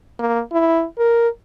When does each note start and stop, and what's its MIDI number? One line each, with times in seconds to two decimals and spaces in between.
0.19 0.41 58
0.52 0.85 64
0.98 1.28 70